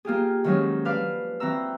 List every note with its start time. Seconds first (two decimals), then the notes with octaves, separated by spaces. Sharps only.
0.05 A#3 F4 G4 G#4
0.44 D#3 F3 F#3 G#3 C#4
0.85 D4 B4 F5 D6
1.40 E3 C4 F#4 A#5 E6